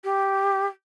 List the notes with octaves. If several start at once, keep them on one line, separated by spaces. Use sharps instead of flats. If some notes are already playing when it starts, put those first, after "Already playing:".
G4